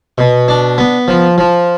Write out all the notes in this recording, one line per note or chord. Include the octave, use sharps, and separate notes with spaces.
B2
D4
B3
F3
F3